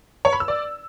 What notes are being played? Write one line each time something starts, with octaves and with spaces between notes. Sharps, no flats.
C#5
B5
E6
D5